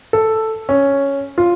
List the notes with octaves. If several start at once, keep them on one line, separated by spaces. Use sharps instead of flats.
A4
C#4
F4